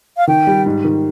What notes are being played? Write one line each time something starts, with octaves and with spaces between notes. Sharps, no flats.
F5
D#3 G5
G3
G#2
D#3